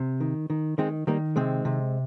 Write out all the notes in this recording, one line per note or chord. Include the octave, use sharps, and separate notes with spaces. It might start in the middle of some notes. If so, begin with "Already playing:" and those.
Already playing: C3
D#3
D#3
D#3 G#3 C4
D#3 G3 A#3
C3 G#3 C4
C3